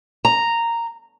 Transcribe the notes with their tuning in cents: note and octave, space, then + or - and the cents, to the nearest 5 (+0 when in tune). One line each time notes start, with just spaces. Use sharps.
A#5 -5